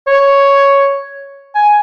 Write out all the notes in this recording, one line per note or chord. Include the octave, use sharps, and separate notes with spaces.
C#5
G#5